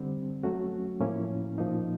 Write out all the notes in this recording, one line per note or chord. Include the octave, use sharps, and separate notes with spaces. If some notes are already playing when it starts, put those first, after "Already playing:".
Already playing: D3 G3 C4
F#3 A3 C#4 F#4
A2 F3 A#3 C#4 E4
A#2 F3 A#3 D#4